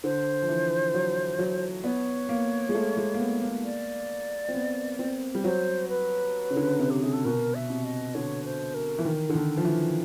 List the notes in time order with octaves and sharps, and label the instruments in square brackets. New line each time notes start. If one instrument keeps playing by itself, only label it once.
[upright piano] D3 [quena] C5
[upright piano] F3
E3
F#3
F#3
[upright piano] B3 [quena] C#5 D5
[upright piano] A#3
G#3
A3
G#3
A#3
B3
A#3
[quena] D5
[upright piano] C4
B3
C4
G3
[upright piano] F#3 [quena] C5
[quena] B4
[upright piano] C#3
D3
C3
[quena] G4
[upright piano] C3 [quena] G#4
[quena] A4
[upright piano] B2 [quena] A#4
[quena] E5
[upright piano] C3
[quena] D#5
[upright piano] D3 [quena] C#5
[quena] C5
A#4
[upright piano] E3
[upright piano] D#3 [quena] A#4
[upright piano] D3
[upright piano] D#3 [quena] A4
[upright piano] F3
E3